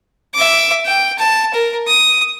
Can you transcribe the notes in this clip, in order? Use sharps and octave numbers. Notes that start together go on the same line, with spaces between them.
E5 D6
G5
A5
A#4
D#6